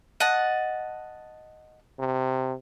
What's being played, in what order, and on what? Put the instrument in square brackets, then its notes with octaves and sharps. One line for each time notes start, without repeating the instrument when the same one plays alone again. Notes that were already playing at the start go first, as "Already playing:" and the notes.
[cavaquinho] D#5 F#5 A5
[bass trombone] C3